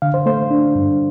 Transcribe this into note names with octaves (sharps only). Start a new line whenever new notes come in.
D3 F5
C5
A3 C5
D4
G2